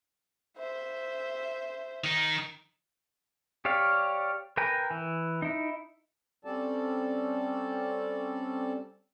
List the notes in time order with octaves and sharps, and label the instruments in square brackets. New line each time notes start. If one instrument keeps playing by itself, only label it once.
[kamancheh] C5 E5
[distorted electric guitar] D#3 D#4
[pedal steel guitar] G4 C#5 D5 F5
A#4 B4 G5 G#5 A#5
E3
D#4 E4
[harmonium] G3 C4 C#4 A4 D5 A5